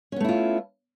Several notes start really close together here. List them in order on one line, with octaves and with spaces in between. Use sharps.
C#4 B3 A3 E4 F4